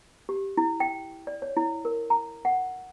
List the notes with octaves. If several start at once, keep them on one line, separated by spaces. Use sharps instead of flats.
G4
E4
G5
D5
C#5
E4
A#4
A#5
F#5